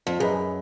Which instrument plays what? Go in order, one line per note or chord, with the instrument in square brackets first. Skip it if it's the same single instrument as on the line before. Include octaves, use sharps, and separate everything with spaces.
[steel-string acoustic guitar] F2
[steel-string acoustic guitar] F#2 [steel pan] G#4 B4 D#5